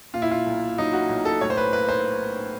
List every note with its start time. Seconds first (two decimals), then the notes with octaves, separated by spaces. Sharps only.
0.14 A#2 F4
0.22 E4
0.31 F4
0.47 B1
0.78 F#3 D#4
0.93 F#4
1.10 B1
1.25 A4
1.41 A2 C#5
1.50 C5
1.57 B4
1.72 A#3 B4
1.89 C5